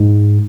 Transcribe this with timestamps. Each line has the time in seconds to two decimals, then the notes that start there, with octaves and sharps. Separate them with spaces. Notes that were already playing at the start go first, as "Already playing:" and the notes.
Already playing: G#2